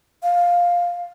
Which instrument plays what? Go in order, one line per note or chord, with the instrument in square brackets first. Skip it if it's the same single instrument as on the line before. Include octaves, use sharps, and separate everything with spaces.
[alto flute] F5